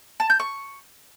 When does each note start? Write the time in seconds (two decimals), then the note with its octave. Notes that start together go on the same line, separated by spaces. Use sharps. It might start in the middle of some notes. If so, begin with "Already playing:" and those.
0.20 A5
0.30 G6
0.40 C#6